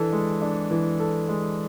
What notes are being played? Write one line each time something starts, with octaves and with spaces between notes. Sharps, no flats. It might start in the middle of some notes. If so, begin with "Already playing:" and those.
Already playing: E3 D4 A4
G#3
D4
E3
A4
G#3